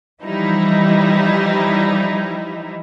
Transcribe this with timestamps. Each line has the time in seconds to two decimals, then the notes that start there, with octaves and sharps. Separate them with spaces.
0.21 E3 F3 G3 D#4 E4